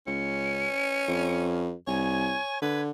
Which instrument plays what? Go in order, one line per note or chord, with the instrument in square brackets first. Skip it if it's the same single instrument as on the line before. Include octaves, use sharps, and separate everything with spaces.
[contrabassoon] C#2 [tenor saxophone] C#4 [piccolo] C#7
[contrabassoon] F2
[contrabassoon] C2 [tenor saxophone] C#5 [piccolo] G#5
[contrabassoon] D3 [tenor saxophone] B4 [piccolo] G#6